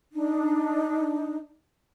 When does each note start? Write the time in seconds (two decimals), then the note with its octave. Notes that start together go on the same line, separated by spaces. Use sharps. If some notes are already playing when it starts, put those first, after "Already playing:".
0.12 D4 D#4